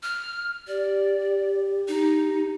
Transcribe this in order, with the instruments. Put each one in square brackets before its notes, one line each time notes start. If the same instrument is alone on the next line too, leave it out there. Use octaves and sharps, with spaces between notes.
[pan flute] F6
[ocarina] G4 [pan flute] D5
[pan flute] D#4